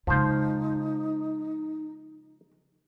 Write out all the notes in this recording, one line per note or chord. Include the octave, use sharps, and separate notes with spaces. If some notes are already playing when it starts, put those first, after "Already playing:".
C#3 F3 G#3 D#4 C5